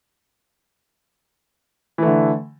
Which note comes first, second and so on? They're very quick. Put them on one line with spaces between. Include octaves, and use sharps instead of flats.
E3 A3 D3